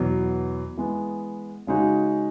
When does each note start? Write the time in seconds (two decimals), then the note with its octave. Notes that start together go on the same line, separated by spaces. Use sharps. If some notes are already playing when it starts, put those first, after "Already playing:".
Already playing: E2 B2 F#3
0.77 E3 G#3 B3
1.67 C#3 G#3 D#4 F#4